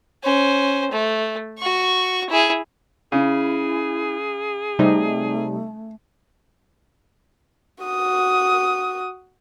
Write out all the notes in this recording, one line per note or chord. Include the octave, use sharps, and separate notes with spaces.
C#4 C5
A3
F#4 C#6
E4 G#4
C#3 E4 G#4
C3 G3 A3 D#4
F#4 D#6